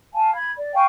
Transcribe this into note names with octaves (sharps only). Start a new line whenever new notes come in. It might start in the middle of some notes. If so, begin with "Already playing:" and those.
F5 G#5 A5
B5 G#6
D5
F5 G5 G#5 C#6